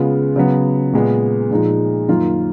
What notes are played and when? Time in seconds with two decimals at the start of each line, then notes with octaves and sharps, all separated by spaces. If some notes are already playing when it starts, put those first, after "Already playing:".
Already playing: C#3 G#3 B3 F4
0.36 C#3 F#3 B3
0.93 A#2 G#3 B3
1.51 A#2 F3 G#3 D#4
2.08 F#2 D#3 A#3 F4